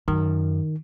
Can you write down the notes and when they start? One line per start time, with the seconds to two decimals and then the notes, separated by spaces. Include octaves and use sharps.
0.08 F#2 D#3